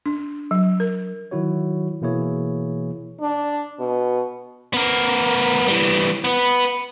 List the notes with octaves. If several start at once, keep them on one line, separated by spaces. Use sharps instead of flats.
D4
F#3
A#4
D#3 F#3 E4 F#4 C#5
B2 E3 A#3 E4 G#4 C#5
D4
B2
B3 A#4
E3 G3
B3 B4